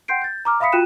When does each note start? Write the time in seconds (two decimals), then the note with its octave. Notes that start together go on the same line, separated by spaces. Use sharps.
0.08 F#5 G5 C6 G6 C7 D7
0.22 G6 A6
0.45 A#5 D6 F6
0.60 E5 F5 B5 D#6 B6 C#7
0.72 F4 F#4 G5 F#6 D#7 E7